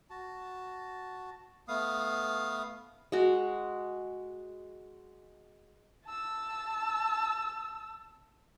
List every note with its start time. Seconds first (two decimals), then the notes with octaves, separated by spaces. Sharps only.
0.10 F#4 A5
1.68 A3 B3 F5 D#6
3.12 G#3 F#4
6.05 A5 E6